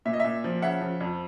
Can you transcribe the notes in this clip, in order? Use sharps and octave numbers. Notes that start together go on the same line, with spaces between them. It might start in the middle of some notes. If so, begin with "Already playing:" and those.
A#2 E5
D#5
A#2 E5
F3
C#3 E5 F#5
F3
F2